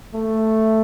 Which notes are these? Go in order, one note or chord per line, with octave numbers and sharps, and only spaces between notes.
A3